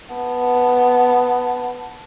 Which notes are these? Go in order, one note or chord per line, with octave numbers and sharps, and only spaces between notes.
B3 A5